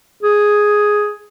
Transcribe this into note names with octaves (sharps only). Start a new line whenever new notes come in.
G#4